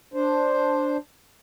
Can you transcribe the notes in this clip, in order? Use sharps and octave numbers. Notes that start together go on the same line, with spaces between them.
D4 C5